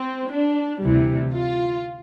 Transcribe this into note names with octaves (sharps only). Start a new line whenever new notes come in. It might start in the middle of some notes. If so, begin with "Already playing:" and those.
Already playing: C4
D4
D2 C3 E3 G3
F4